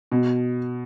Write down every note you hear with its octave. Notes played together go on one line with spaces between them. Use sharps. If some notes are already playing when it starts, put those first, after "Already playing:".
B2